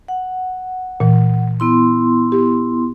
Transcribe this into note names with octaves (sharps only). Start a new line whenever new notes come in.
F#5
A#2 E3
B3 E4 C6
G4